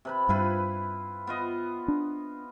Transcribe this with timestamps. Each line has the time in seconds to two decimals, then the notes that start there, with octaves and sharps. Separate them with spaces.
0.05 C3 B4 B5
0.29 G2 E4 F4 B4
1.27 B3 F4 D#5
1.88 D4